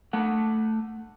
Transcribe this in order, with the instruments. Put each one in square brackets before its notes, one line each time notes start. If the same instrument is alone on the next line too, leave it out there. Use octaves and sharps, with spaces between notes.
[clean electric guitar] A3 F#5